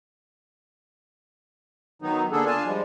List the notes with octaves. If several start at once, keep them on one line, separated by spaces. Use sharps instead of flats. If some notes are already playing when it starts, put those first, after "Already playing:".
D#3 F#3 B3 D#4
D3 A#3 B3 D4 G#4 A4
D4 F4 G#5 A5
F3 G3 G#3